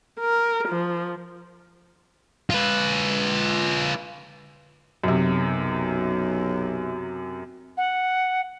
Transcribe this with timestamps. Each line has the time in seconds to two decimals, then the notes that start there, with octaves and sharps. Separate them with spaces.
0.20 A#4
0.68 F3
2.50 F4 B4
5.04 B1 F#2 C3
7.77 F#5